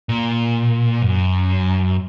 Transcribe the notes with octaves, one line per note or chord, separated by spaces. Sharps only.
A#2
F#2